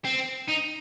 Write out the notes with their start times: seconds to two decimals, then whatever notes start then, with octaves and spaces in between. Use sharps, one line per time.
0.05 C4
0.49 D#4